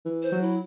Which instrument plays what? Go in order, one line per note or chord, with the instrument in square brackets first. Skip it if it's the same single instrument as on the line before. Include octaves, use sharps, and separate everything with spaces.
[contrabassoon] E3
[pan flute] C5
[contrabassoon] F#3
[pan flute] E4